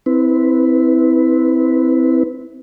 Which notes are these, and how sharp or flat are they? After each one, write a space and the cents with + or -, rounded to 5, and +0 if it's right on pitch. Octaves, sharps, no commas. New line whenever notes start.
C4 -10 E4 -20 B4 +5